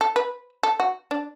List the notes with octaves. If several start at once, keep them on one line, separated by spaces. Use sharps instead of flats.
A4
B4
A4
F#4
D4